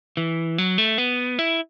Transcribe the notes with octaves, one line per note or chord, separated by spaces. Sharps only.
E3
F#3
A3
B3
E4